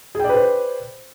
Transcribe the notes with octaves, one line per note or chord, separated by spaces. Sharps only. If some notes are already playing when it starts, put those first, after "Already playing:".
G#4 B4 C5 D5 G5